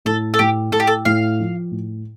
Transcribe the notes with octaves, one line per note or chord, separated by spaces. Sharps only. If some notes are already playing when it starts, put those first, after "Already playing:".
A2 A4
A4
A2 G4
A2 A4
G4
A4
A2 F5
F3
A2